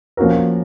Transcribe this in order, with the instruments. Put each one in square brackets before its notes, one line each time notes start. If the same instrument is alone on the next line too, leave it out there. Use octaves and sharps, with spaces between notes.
[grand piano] F3 A#3 C#4 F#4 A#4